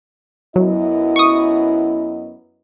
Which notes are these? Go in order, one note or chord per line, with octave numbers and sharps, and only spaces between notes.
F#2 F#3 B3 E4 D#5
C#6 D#6